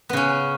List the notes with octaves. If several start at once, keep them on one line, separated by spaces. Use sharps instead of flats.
C#3 B3 C#4